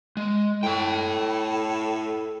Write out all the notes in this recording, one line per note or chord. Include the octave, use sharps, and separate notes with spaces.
G#3
A2 A4 G5